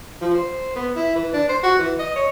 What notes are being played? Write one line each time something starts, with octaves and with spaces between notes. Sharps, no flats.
F3
C5
B3
E4
E3
D4
C5
F#4
E3
D#5
C#5